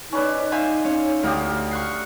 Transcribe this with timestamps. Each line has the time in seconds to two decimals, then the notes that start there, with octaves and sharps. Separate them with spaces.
0.13 C#4 D#4 B4 D5
0.52 C5 E5 F5 G#5
0.84 C#4
1.23 D2 G4 D#5 F5
1.71 C#6 F#6 C7